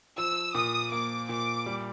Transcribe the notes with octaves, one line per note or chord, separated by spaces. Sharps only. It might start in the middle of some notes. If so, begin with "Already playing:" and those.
F3 E6
A#2 D#6
A#3 D6
A#2 D6
G3